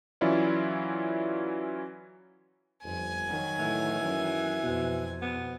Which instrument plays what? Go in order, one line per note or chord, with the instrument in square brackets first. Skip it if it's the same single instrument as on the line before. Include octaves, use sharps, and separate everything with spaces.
[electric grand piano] E3 F#3 C#4 E4 F4 D5
[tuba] G1 [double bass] F2 [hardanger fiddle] G#5
[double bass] D#3 F#3
[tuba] A2 [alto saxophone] E3
[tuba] F#2
[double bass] F2 [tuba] B2
[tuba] B2 [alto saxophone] B3